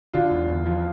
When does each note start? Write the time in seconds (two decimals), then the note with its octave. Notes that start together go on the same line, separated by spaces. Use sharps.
0.13 D3 F4
0.31 E2
0.48 E2
0.66 F3